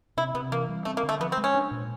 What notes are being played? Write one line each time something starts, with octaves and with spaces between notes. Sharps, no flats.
C3 E4
C3 B3
E3 A#3
G3
A3 C4
A#3
D3
A3
F3 B3
C4
G#3
C#4
D4
A#2